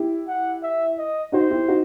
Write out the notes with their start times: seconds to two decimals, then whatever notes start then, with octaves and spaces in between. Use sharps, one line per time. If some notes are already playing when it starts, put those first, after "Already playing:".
Already playing: E4 G4
0.28 F#5
0.63 E5
0.98 D#5
1.32 D#4 F#4 C5
1.50 E4 G4
1.68 D#4 F#4